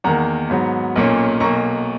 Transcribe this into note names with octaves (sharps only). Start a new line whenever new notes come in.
E2 D#3 A#3 F#5 A#5
G#2 F#3 B3
B1 A#2 A#3 C#4
B1 B2 A#3 A#5 C#6